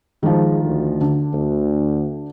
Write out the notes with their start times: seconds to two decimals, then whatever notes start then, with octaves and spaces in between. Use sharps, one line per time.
0.23 D#3 F3 G#3
0.63 D2
1.01 D3
1.33 D2